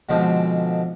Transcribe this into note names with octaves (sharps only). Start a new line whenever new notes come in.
B2 D3 F3 G#3 C4 D#4